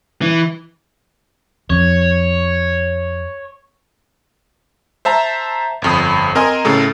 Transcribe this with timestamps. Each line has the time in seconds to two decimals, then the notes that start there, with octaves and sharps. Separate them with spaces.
0.22 E3
1.70 F2 C#5
5.05 C5 E5 A5 A#5
5.82 G1 F2 D#6
6.35 C4 A#4 D#5 G#5 C6
6.65 A2 C#3 A4 A#4